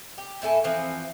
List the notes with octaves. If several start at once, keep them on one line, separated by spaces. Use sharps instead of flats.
G4
A2 E4 A4 G#5
E3 F3 C4